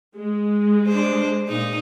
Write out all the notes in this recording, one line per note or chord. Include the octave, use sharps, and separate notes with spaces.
G#3
D4 C5
A#2 D#4